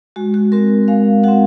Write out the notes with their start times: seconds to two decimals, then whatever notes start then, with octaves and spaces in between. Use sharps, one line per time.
0.16 G#3 F#4
0.34 F#4
0.52 C4 F#4 A#4
0.88 G#3 F5
1.23 C4 F#4 F#5